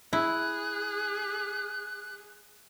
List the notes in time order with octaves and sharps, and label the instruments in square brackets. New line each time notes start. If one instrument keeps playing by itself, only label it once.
[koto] E4 [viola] G#4 [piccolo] F#6